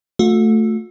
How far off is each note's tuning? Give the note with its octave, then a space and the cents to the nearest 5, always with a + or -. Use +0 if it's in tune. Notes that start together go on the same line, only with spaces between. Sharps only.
A3 +0 F#4 -45